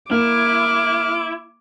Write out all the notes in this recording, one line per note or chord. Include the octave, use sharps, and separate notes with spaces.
A#3 E4 D6 F6